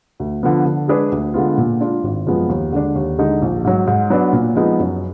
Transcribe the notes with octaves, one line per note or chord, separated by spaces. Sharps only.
D2
D3 F3 B3
D3
G#3 D4 G#4 B4
D2
D3 G#3 B3 F4
A#2
G#3 D4 F4
G#1
F#2 F3 G#3 B3
D#2
D3 G#3 D4
D#2
D3 G#3 D#4
A#1
G#2 F#3
G#2
F#3 B3 D4
A#2
F3 G#3 B3 D#4
F#2